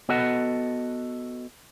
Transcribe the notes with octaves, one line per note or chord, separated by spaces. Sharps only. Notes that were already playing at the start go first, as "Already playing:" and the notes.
B3 F#4 A4 D#5 F#5